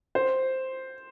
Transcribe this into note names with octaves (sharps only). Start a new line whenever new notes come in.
C5